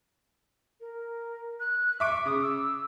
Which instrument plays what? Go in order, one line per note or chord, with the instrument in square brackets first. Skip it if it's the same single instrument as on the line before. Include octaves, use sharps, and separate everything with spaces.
[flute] A#4
F#6
[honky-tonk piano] E5 D6 D7 [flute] C#6
[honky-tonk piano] C#3 [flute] D#6
[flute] E6